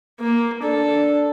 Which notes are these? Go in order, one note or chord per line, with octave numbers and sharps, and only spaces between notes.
A#3
D4 A4